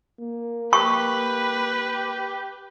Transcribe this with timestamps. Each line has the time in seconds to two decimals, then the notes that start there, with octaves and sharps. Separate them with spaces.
0.21 A#3
0.73 G4 B4 C#6